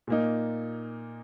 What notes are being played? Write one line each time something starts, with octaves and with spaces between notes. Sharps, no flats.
A#2 A#3 D#4